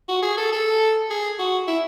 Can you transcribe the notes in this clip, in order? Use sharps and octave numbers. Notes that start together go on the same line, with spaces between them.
F#4
G#4
A4
A4
G#4
F#4
E4